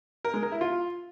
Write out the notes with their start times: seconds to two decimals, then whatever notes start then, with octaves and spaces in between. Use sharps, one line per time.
0.25 A#4
0.34 G#3
0.43 A#4
0.52 E4
0.61 F4